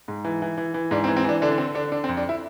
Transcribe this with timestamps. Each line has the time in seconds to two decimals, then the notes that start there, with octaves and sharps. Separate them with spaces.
0.08 G#2
0.25 E3
0.42 E3
0.57 E3
0.74 E3
0.91 G#2 D4
1.04 C4
1.08 E3
1.17 C4
1.24 E3 D4
1.42 D3 D4
1.52 D4
1.58 D3 C4
1.75 D3 D4
1.92 D3 D4
2.04 C4
2.09 F2
2.17 D4
2.29 E4